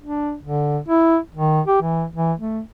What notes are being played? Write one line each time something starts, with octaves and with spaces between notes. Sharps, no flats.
D4
D3
E4
D#3
G4
E3
E3
A3